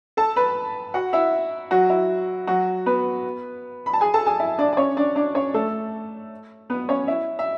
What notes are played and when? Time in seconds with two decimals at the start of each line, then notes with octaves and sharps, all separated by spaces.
0.17 A4 A5
0.36 B4 B5
0.94 F#4 F#5
1.13 E4 E5
1.71 F#3 F#4
1.90 E4
2.47 F#3 F#4
2.86 B3 B4
3.86 B5
3.93 A5
4.01 G#4 G#5
4.14 A4 A5
4.26 G#4 G#5
4.39 E4 E5
4.58 D4 D5
4.73 D5
4.77 C#4 C#5
4.97 D4 D5
5.16 D4 D5
5.35 C#4 C#5
5.54 A3 A4
6.70 B3 B4
6.89 C#4 C#5
7.08 E4 E5
7.39 E5